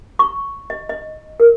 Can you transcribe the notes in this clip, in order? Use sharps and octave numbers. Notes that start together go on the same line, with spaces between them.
C#6
D#5
D#5
A#4